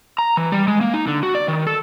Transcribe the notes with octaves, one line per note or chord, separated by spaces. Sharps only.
A#5
E3
G3
G#3
A#3
D#4
D3
F#4
D5
D#3
A4